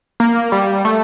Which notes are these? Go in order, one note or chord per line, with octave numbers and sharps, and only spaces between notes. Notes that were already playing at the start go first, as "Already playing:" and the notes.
A#3
G3
A3